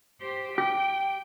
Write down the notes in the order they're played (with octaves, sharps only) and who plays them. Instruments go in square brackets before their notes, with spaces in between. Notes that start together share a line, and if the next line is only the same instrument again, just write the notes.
[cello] G4 C5
[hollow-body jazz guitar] G4 [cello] G5